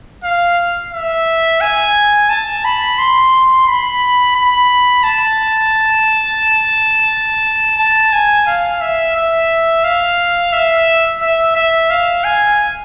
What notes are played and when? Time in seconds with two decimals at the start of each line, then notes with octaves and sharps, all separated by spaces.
0.24 F5
0.93 E5
1.61 G#5
2.30 A5
2.65 B5
2.99 C6
3.67 B5
4.36 B5
5.04 A5
7.78 A5
8.13 G#5
8.47 F5
8.81 E5
9.16 E5
9.84 F5
10.53 E5
11.22 E5
11.56 E5
11.90 F5
12.24 G#5